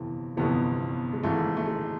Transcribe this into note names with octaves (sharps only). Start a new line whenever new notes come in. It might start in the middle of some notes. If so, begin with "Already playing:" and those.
Already playing: G1 F2 C3 E3
G1 F2 C3 E3 B3
G#3
G#1 G#2 E3 A3
A3
G#3